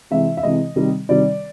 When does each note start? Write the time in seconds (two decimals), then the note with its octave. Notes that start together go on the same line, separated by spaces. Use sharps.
0.11 C3 E3 G#3 E5
0.37 E5
0.43 C3 E3 G#3 D#5
0.76 C3 D#3 G3
1.09 C3 D#3 G3 D5